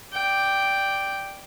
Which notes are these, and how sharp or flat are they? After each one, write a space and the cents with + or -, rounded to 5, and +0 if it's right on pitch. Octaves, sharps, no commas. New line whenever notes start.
D5 +0 G5 +0